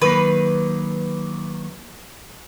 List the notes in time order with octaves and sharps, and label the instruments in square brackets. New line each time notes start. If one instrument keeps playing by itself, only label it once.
[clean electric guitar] D#3 F#3 A#3 [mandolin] B4